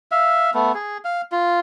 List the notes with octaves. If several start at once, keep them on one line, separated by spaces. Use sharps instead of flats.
E5 F5
A3 B3
G#4
F5
F4